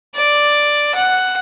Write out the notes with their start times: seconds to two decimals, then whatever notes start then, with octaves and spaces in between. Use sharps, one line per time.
0.15 D5
0.95 F#5